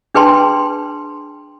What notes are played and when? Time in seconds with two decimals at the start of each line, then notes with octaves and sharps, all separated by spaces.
0.15 D4 G#4 B4 G5 A5 C6